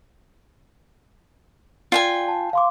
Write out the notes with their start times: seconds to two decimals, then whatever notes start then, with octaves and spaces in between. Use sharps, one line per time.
1.92 F4 D5 G5 G#5
2.28 A5
2.53 F5 C6 D6